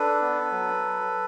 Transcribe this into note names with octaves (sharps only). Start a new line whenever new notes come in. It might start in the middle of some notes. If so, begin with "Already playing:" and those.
Already playing: D4 A4 B4
B3
F#3